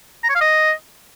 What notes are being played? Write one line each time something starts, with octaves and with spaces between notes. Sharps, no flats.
A#5
C#5
F5
D#5